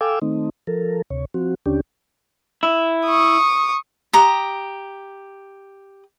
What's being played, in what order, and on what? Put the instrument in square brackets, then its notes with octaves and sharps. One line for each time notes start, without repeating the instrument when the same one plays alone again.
[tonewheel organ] A4 F5 G5 G#5 D6 E6
D#3 A3 C4 D#4
F3 A4 A#4
D2 C3 C#5
F3 C4 F#4
D#2 D3 C#4 D4 G4
[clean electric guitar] E4
[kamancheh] C#6 D#6
[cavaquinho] G4 A#5 D#6